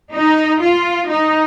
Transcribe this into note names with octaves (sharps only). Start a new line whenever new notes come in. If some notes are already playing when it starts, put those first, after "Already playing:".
D#4
F4
D#4